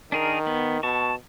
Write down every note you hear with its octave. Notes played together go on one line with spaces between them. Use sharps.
D#3 D4 G#4 A#4
B3
B2 A5 C#6